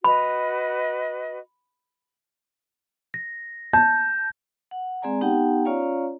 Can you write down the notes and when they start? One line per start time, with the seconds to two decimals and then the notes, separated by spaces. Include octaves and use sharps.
0.04 F#4 B4 D#5 B5
3.14 A#6
3.73 A5 G6
4.71 F#5
5.02 G#3 C4 G#4 D5 G#5 A#5
5.21 B3 D#4 G4 F#5 G5 A5
5.65 C#4 F4 C#5 D5 F5 A#5